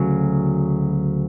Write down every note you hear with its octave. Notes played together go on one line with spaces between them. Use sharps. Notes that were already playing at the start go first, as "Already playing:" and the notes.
Already playing: D2 C#3 F#3